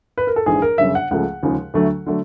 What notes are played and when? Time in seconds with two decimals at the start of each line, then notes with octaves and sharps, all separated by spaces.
0.18 B4
0.27 A#4
0.36 A4
0.46 A#1 G#2 E3 G#4
0.62 A#4
0.78 G1 F#2 C#3 E5
0.95 F#5
1.11 C#2 C#3 F3 A3 F#5
1.43 D#2 C#3 F3 G#3
1.74 D2 D3 F#3 A3
2.06 D3 F#3 A3